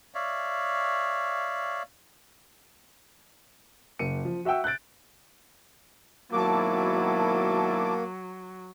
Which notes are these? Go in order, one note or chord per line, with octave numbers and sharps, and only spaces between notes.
C#5 D5 E5 F5
F#1 C#7 D#7
F3
F#4 E5 F#5 G5 E6
F#6 G6 A6 D7
G#1 B2 F#3 A#3 E4 A5 D6